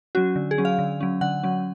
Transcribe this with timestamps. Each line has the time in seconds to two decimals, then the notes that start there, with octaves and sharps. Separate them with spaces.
0.15 F#3 C#4 F#4
0.36 D3
0.51 G#4
0.58 F#3 C#4
0.65 F5
0.79 D3
1.00 F#3 C#4
1.21 D3 F#5
1.43 F#3 C#4